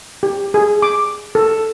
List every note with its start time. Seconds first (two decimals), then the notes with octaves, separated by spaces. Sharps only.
0.23 G4
0.54 G#4
0.82 D6
1.35 A4